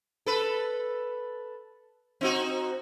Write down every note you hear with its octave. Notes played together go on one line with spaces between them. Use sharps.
A4 B4
C4 D#4 F#4